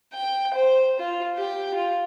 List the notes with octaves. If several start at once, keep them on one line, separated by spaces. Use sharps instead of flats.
G5
C5
F4
G4 G5
F4